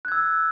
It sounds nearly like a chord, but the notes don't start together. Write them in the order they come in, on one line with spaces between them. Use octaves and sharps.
F#6 G#6 E6